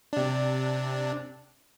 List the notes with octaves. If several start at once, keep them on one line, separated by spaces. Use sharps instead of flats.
C3 D4